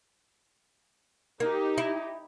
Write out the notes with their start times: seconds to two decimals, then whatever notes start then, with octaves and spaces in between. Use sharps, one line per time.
1.40 A#3 D#4 G4
1.78 E4